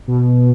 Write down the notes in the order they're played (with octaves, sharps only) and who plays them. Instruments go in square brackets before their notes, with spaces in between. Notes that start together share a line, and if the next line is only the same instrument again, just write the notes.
[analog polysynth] B2